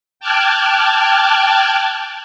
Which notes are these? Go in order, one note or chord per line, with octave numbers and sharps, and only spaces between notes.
G5 A5 D6 F6 F#6 G#6